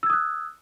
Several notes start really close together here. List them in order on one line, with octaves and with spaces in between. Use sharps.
E6 G#6 D#6 F#6